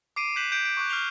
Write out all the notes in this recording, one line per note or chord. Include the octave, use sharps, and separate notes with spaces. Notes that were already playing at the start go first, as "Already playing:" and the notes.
D6 C7 D7 D#7
F#6 G6 B6 C7 E7 F#7
G6 D7
D7
C#6 D6 F#6
F6 C7 F7 G7